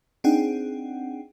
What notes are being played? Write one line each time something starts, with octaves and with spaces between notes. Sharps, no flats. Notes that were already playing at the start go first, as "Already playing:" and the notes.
C4 D4 D#4 G#4 F#5 G5